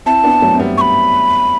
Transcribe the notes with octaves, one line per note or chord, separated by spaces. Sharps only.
C4 E4 A5
B3 D4
F#3 A3
C4
G3 B3
C#6
B5